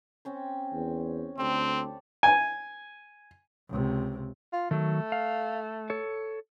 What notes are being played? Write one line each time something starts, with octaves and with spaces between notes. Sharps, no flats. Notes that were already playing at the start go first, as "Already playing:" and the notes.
C4 C#4 C5
E2
D2 C4 G4 A4 D5
G#5
C#2 C3
F4
D#3 F#3 A3
F5
A4 C#5